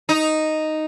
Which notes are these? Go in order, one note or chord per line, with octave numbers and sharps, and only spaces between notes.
D#4